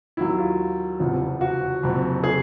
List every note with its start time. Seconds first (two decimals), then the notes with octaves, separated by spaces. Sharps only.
0.17 D#2 D#3 F#3 E4
0.38 F4
0.99 F1 E2 C#3 F3
1.41 F#4
1.83 F#1 F2 C3
2.24 G#4